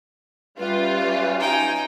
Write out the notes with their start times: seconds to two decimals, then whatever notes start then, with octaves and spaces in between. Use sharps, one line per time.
0.58 G3 C#4 F4 G4 B4 E5
0.98 B4
1.40 D#4 G5 G#5